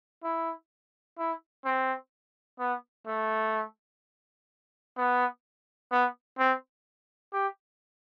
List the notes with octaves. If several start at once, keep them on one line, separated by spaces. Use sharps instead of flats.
E4
E4
C4
B3
A3
B3
B3
C4
G4